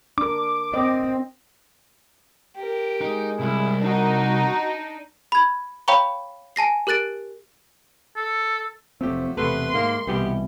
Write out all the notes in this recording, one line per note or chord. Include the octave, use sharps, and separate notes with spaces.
D4 A#4 D6
C4 D#5
G4 A#4
G#3 D#4
C2 E4
D4 D#4 F#4
B5 G#6
C#5 F5 G5 A#5 B5 C#6
G#5 A5 A#6 C7
G4 A#4 F#6 A6 D7
A4
F1 F3 F#3 A3 C4 G4
E1 C3 A3 B3 A4 B4 C6
G#2 D#3 A#3 A#4
C2 B2 E3 G3 B3 G4